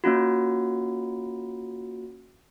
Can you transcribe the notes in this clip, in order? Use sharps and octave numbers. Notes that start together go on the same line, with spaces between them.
A#3 C#4 F4 F#4